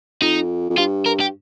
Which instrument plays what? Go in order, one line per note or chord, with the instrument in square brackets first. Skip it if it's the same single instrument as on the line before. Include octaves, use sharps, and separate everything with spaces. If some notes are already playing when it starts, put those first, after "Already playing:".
[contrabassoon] F2 [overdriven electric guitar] D#4
[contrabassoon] F2
[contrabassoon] G2 [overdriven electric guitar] F4
[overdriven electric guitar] A#4
G4